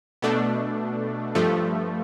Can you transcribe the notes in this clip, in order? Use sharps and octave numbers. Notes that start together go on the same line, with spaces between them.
B2 A3 D4
G2 F3 A3